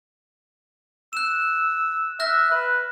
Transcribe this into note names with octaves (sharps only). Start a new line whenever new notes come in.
E6 F#6 E7
E5 F6 F#6 A#6
B4